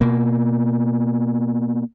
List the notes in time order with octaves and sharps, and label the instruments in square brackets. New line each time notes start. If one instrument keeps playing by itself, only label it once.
[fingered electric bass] B2 A#3